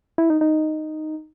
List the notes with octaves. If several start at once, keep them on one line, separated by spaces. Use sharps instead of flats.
E4
D#4
D#4